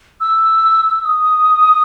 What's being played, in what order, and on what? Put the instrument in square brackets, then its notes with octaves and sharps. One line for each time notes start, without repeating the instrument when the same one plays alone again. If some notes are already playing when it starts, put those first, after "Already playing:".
[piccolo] E6
D#6